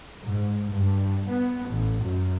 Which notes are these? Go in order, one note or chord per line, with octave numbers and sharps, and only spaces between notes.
G#2
G2
B3
A1
F#2